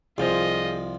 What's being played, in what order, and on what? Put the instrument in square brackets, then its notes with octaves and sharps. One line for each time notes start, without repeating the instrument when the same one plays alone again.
[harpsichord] C2 F3 [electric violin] F4 D#5 [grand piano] G#4 C5